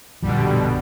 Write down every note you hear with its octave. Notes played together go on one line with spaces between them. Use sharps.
A#1 F#2 B2 D3 F3 G3